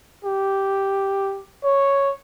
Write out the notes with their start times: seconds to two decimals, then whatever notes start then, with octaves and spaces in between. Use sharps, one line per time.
0.24 G4
1.64 C#5